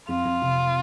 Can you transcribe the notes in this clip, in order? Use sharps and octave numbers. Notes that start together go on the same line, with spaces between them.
F2 F4
F2
C3